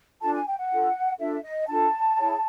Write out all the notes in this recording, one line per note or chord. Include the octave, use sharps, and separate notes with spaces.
D4 F4 A4 A5
G#5
G5
F#5
D4 F4 A4
D4 F4 A4 E5
D#5
D4 F4 A4 A5
E4 G#4 C#5